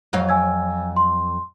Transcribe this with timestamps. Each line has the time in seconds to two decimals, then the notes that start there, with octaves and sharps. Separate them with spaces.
0.13 F2 F#3 F5
0.29 G#5 E6 G#6
0.96 C6